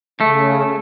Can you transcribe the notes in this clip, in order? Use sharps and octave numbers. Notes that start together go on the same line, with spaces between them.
C#3 A3